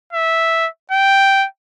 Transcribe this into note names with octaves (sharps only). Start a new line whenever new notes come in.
E5
G5